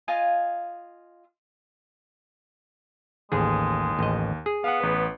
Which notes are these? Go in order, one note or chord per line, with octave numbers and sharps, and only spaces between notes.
F4 D#5 F5 G#5
A1 D#2 G#3 G#4
A1 D#5
G#4
B3 F5 F#5
A1 B4